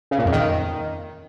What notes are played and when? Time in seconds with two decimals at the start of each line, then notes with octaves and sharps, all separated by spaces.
0.11 C#3
0.18 A#2
0.25 F2
0.32 D#3